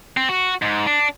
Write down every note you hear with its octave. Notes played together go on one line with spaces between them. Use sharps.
C4
F#4
G#2
D4